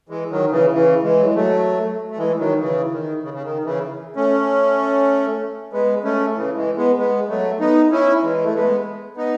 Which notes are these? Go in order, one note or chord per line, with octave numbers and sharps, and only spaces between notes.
E3 G#3
D#3 F#3
C#3 E3
C#3 E3
E3 G#3
F#3
G#3
F#3 A3
A3
E3 G#3
D#3 F#3
C#3 E3
D#3
C#3
C#3
D#3
C#3 E3
A3 C#4
G#3 B3
A3 C#4
C#3 E3
E3 G#3
G#3 B3
G#3 B3
F#3 A3
B3 D#4
C#4 E4
E3 G#3
A3
G#3 B3
B3 D#4